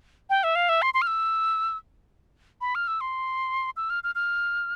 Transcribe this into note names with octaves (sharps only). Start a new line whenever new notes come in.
G5
E5
F5
E5
C6
C6
F6
E6
B5
F6
E6
C6
E6
F6
F6
F6